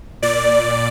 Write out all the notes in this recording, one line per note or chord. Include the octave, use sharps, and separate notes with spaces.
A#2 D5